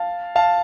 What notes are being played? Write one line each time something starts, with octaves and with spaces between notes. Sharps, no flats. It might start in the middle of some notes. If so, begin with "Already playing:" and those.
Already playing: F5 A5
F5 A5